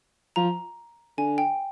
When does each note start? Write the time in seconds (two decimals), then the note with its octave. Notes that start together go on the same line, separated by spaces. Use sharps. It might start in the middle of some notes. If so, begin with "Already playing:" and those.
0.36 F3 A#5
1.18 D3 G#5
1.38 G5